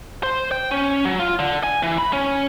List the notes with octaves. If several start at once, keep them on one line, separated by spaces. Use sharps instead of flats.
C5
G5
C#4
F#3
F4
D3
G#5
E3
B5
C#4